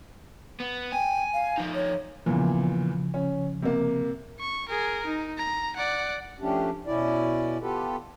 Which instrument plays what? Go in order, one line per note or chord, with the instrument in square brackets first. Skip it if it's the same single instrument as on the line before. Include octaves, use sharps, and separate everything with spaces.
[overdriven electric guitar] B3
[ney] G5 [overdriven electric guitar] G#5
[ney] F5
[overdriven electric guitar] F3 D#4
[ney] C#5
[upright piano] E2 A#2 E3 [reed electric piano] C#3 F3
[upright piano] C#4
C3 A#3
[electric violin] C#6
G#4 A#4
D#4
A#5
D5 F#5
[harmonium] F3 A3 C#4 D4 G4
B2 C#4 E4 D5
B3 F4 G4 A4 B4